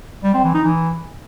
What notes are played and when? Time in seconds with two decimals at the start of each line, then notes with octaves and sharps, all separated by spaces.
0.24 G3
0.34 C4
0.44 E3
0.54 D#4
0.64 E3